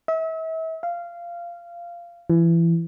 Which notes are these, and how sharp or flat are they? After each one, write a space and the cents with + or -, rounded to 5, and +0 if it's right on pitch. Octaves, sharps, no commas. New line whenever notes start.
E5 -35
F5 -15
E3 +25